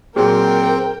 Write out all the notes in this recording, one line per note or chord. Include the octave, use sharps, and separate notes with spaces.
A#2 F#3 C4 G#4 A#4 G5